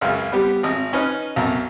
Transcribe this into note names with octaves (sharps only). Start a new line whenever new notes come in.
C#2 F#2 C#3
G3 B3 G4
G#1 D#5 D#6
C#4 D#4 B4 F6
B1 F#2 A#5